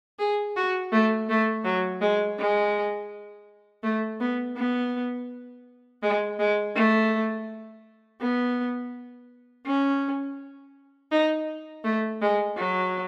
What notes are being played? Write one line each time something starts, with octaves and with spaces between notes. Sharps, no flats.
G#4
F#4
A3
A3
F#3
G#3
G#3
A3
B3
B3
G#3
G#3
A3
B3
C#4
D#4
A3
G#3
F#3